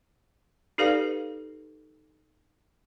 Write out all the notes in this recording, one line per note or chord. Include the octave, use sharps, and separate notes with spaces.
D#4 G4 A4 B4 D5 F5